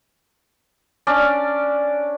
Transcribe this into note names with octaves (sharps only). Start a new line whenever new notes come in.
C#4 D4 D5